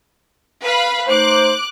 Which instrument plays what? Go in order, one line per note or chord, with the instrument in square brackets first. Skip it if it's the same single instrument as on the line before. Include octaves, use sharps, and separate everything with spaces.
[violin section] B4 F5 B5
[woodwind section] A3 D#4 C5 [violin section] D6 F#6